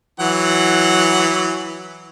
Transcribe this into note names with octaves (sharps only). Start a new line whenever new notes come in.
E3 F#3 F#5